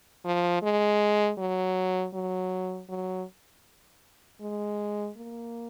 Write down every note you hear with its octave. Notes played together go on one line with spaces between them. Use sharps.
F3
G#3
F#3
F#3
F#3
G#3
A#3